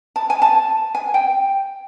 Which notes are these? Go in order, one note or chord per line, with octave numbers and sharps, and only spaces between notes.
A5
G#5
A5
G#5
G5